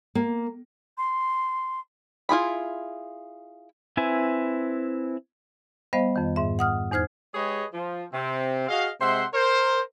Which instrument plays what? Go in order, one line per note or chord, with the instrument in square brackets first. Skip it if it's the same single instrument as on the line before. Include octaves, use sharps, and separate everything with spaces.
[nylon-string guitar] A#3
[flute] C6
[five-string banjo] E4 F4 G#4 B5
[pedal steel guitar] C4 E4 B4 G#5
[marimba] G3 B3 C5 D#5 F5
F2 D#3
G#2 E5
F#5 D#6 F6
E2 D#4 C5 F6 G#6
[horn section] G#3 G4 G#4 B4 C#5 D#5
F3
C3 C4
F#4 G#4 D#5 F5
C3 G#3 C5 E5 F#5 C6
A#4 C5